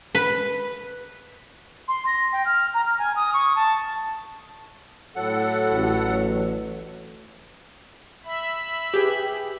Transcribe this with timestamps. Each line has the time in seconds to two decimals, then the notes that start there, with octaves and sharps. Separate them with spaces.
0.15 B4
1.88 C6
2.07 A#6
2.33 G5
2.45 F6
2.74 A#5
2.86 F6
2.99 G#5
3.16 D#6
3.34 C#6
3.56 A5
5.16 A2 F#3 A4 F#5
5.73 A1
8.25 E5 B5
8.94 G4 G#4 B4